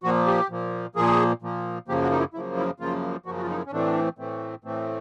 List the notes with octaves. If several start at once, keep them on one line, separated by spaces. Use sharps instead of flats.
A#2 F3 A#3 F#4
G4
A#2 F3 A#3
A#2 F3 A#3 G#4
A#2 F3 A#3
F#2 C#3 F3 A#3 G4
F#4
D#4
E4
F#2 C#3 F3 A#3 E4
E4
F#2 C#3 F3 A#3 F4
F#2 C#3 F3 A#3 F#4
F#4
F4
D#4
E4
C#4
A2 E3 A3 C4 D4
A2 E3 A3 C4
A2 E3 A3 C4